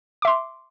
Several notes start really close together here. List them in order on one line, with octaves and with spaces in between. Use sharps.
D6 E5 C6